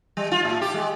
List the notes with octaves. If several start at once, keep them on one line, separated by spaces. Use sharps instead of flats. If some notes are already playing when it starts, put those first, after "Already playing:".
G3
F4
A2
G4
G#3